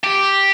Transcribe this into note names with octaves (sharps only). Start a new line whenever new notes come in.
G4